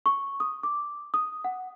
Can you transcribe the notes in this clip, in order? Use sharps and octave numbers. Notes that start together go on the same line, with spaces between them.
C#6
D#6
D6
D#6
F#5